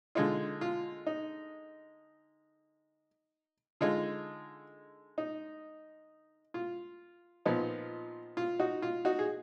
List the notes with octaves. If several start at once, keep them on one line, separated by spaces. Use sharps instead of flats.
D3 G#3 D#4 F4
F4
D#4
D3 G#3 D#4 F4
D#4
F4
A#2 F3 B3 D#4
F4
D#4 F#4
F4
D#4 F#4
G#4